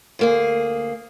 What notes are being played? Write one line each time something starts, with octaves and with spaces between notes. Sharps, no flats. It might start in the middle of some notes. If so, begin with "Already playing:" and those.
D2 A#3 G#4